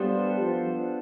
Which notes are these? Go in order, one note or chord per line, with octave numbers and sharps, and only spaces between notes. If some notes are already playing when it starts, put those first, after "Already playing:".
Already playing: G3 B3 D4 F4 A4 C5
F3